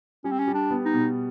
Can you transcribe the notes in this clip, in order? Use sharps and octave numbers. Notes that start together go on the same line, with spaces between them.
G3 C#4
C4
C#4
G3
D4
B3
D#4
B2